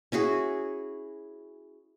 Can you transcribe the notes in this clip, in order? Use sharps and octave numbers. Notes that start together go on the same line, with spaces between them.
C#4 E4 F#4 G#4